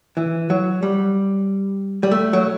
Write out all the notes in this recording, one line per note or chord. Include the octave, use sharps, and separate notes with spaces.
E3
F#3
G3
G3
A3
F#3